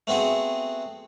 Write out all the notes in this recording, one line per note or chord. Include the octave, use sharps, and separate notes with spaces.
A3 B3 C4 F#4 G#4